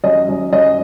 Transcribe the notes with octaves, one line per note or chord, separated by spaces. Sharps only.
F#2 D#5
F#2
F#2 D#5